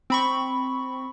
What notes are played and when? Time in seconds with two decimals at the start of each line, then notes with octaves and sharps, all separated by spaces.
0.10 C4 B5 C#6